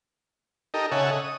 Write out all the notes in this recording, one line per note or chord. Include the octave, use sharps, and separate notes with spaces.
D#4 G4 A4 A#4 D#5
C#3 A4 C#5 E5 F#5 G#5
D#5
D#6